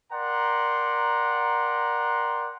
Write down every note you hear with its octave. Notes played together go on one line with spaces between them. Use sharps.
A#4 D5 F#5 G5 A#5 C6